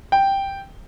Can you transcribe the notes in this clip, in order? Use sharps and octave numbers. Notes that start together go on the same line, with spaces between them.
G5